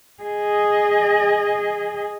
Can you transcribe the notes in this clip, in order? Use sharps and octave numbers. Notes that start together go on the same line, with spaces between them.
G#4 D#5